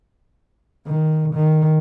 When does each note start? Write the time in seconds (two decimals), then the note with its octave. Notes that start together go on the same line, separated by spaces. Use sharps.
0.87 D#3
1.34 D#3